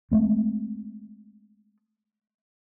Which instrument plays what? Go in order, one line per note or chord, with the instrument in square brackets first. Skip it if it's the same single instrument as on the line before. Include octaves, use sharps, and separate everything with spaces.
[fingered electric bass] G#3 A3 C4